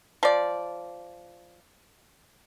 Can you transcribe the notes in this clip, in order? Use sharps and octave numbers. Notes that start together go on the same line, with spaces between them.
F3 D5